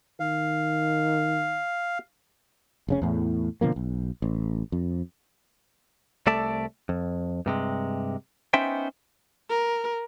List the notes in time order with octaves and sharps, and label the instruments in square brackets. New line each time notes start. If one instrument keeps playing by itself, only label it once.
[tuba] D#3 [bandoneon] F5
[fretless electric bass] F1 C#3 C#4
E2 A2
B2 D3 F3 A#3
B1
A1
F2
[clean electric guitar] C2 A3 A4 D5 E5 A5
F2
G2 C3 G#3
B3 C#4 D#4 C5 E5 G5
[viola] A#4